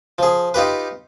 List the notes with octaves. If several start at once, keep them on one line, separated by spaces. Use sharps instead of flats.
F3 G#4
D#4 F4 G4 B4